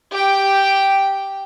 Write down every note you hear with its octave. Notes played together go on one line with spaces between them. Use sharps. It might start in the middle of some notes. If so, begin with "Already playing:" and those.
G4 G5